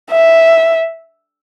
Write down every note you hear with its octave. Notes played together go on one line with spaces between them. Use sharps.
E5